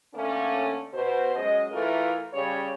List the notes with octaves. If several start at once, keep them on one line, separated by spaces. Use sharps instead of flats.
D3 A3 A#3 C#4
B2 C5
F#2 G#3 D#5
E3 A3 F4 A#4
C#3 G3 C#5